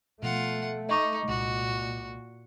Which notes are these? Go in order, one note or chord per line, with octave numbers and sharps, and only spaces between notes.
B2 F3 A3 F4 F#5
D#4 D#5 C#6 D6
C2 A#2 G#3 F#4